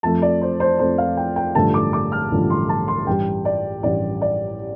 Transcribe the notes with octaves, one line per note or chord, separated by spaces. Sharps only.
F2 F3 A3 A5
D5
C5
C5
F2 F3 A3 C5
F5
G5
G5
A1 G2 D3 F3 A3 A5
D6
D6
F6
A1 G2 D3 F3 A3
C6
A5
C6
A1 G2 G3 G5
D5
A1 G2 G3 D5
D5